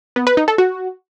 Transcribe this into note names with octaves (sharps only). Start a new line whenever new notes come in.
B3
B4
D#4
A4
F#4